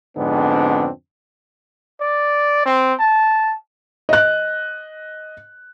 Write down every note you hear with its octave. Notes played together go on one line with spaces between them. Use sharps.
F2 G#2 D3 B3 C4 D4
D5
C4
A5
D#5 F#6